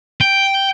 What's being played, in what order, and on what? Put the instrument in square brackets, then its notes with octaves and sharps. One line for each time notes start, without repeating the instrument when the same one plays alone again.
[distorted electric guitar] G5